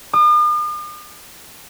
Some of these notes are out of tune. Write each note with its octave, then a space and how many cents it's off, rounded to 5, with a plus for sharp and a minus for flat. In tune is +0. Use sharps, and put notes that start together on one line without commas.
D#6 -45